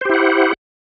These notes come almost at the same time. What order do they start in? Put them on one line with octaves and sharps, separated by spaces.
C5 G4 E4 F#5